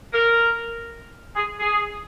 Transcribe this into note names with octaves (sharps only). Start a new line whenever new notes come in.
A#4
G#4
G#4